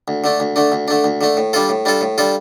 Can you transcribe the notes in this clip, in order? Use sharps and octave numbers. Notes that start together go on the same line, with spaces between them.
D2
D3 A3 D4
D2
D3 A3 D4
D2
D3 A3 D4
D2
D3 A3 D4
A2
G3 D4 F4 A4
A2
G3 D4 F4 A4
A2
G3 D4 F4 A4